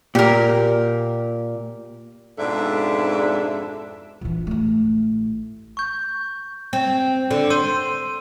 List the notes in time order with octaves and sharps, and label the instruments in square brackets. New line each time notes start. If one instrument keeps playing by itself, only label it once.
[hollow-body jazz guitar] A#2 [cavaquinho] G4 A#4
[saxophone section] F2 G#2 B2 D4 A4 E5
[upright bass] A#1 E3
A1 A3
[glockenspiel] C#6 G6
[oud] C4
D3
[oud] C5 [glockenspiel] C6 E6 D#7